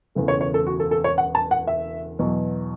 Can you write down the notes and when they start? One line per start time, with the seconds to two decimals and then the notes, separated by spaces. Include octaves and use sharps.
0.15 E1 E2 C#3 A3
0.28 C#5
0.41 C#5
0.54 A4
0.67 F#4
0.80 A4
0.91 A4
1.04 C#5
1.18 F#5
1.35 A5
1.51 F#5
1.67 E5
2.19 E2 B2 F#3